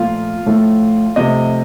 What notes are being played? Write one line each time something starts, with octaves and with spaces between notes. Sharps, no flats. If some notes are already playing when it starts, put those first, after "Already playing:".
Already playing: A#2 F3 A3 F4 F5
A2 F3 A3
C3 F3 A3 D#5